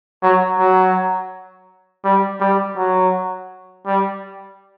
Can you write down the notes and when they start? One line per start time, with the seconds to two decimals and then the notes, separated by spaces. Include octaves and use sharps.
0.22 F#3
0.58 F#3
2.04 G3
2.41 G3
2.77 F#3
3.87 G3